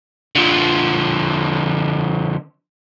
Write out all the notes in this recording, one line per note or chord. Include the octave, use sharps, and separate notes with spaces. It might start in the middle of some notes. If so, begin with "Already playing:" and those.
D3 F3